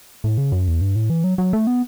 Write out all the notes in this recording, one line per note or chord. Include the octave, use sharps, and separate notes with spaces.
A2
C#3
F#2
E2
G2
A2
E3
F#3
F#3
A3
B3